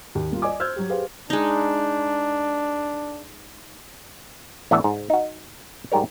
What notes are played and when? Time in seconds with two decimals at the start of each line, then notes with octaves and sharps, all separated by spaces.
0.15 D#2
0.30 G3 A#3 F4
0.42 D5 D#5 G#5 D6
0.60 C5 E6 F6 G6 G#6
0.76 F#3 G4
0.90 G4 G#4 B4 C5 F5
1.30 G#3 D4 D#4
4.71 A1 E3 A3 B3 D4 E5
4.84 G#2
5.10 D#4 F#4
5.92 G#2 G3 G4 A#4 C#5